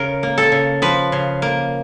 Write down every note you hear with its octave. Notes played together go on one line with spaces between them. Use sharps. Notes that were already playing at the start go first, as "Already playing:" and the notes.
Already playing: C#3 A#4
A#3
A4
C#3
F3 B4
C#3
A#3